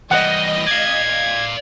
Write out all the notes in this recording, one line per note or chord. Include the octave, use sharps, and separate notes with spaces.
E3 G3 D#5 F#5
D5 F5 G#6